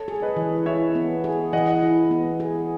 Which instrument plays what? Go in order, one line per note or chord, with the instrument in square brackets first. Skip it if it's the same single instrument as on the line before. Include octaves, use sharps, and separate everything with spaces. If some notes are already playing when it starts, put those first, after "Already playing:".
Already playing: [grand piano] A4 C#5
[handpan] G#4
[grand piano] B4 D#5
[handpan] E3
[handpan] E4 [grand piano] C#5 E5
[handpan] B3
G#4
[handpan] E3 [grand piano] D#5 F#5
[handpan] E4
B3
G#4